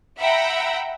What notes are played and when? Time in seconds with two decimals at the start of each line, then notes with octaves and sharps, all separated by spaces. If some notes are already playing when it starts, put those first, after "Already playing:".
0.19 E5 F#5 G5 A#5 B5